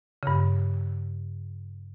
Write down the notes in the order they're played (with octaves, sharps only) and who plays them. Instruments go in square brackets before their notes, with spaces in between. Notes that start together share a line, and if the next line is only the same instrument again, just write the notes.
[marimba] G2 C#3